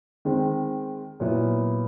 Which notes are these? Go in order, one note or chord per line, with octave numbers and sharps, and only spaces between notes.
D#3 G#3 C4
A#2 F#3 B3 E4